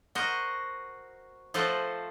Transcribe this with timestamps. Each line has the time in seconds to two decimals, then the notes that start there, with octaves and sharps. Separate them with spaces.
0.15 F#4 A#4 C5 D#5
1.54 F3 A3 A4 C5 D#5 F#5